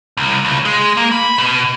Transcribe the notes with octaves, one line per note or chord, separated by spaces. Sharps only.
C2
C#2
G#3
A#3
B5
B2